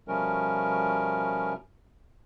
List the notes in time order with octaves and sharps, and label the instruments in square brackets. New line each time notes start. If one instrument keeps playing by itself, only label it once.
[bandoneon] B2 F3 G3 A3 C#4 A#4